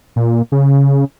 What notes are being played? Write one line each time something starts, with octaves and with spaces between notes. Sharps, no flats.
A#2
C#3